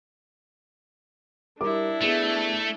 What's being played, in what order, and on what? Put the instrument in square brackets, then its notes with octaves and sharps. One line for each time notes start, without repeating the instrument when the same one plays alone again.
[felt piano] G3 A#4 D6 [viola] D4 E4
[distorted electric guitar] A3 [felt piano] B3 G#4